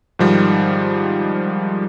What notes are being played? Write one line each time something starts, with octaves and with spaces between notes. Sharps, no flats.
G#2 D#3 F3 G3